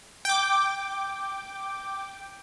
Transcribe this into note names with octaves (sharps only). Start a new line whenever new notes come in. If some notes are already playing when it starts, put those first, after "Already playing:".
G5 D6